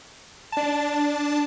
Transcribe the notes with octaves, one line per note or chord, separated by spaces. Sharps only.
D4 A5